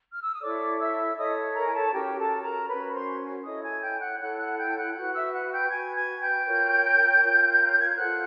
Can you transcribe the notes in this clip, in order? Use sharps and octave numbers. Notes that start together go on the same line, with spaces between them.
F6
E6
D#6
E4 A4 C#5 D5 D6
E5 E6
E4 A4 C#5 D#5 D#6
A#4 A#5
G#5
A4 A5
C#4 F#4 G4 A#4 C#5 G5
A4 A5
A#4 A#5
C#4 F#4 A#4 B4 C#5 B5
C5 C6
E4 A4 C#5 D#5 D#6
G#5 G#6
G5 G6
F#5 F#6
E4 A4 C#5 F#5 F#6
F#5 F#6
G5 G6
F#5 F#6
F#4 B4 F#5 F#6
E5 E6
F#5 F#6
G5 G6
F#4 B4 G#5 G#6
G#5 G#6
G5 G6
F4 A#4 C#5
F4 A#4 C#5
G#6
G6
F4 A4 C5 F#5 F#6